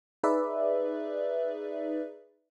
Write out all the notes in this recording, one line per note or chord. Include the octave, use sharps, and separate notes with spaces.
D#4 G#4 B4 D5 E5